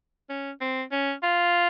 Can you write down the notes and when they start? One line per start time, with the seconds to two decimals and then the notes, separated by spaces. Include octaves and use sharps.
0.29 C#4
0.61 C4
0.92 C#4
1.23 F4